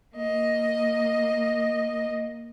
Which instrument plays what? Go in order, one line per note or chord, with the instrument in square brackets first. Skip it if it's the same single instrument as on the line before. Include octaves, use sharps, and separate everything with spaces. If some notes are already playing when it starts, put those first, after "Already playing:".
[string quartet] A#3 D#5